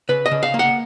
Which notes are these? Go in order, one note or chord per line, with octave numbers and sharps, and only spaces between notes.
C#3 B4
D#5
C#3
F5
A#3
F#5